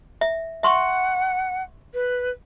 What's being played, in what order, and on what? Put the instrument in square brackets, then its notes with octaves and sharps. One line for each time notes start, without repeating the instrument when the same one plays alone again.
[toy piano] E5
[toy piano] E5 C6 C#6 [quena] F#5
[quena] B4